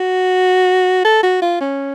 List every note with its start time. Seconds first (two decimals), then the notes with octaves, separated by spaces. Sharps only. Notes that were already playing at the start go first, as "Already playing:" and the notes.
Already playing: F#4
1.04 A4
1.23 F#4
1.42 F4
1.61 C#4